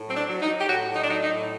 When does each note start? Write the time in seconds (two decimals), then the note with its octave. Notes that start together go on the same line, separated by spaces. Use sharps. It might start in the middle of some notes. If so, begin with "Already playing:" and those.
Already playing: A2
0.09 F#3 C4
0.16 D4
0.29 F#3
0.42 D#4
0.49 F#3
0.60 G4
0.68 A2 F#4
0.89 A2
0.96 D#4
1.03 D4
1.09 F#3 D#4
1.23 D#4
1.29 A2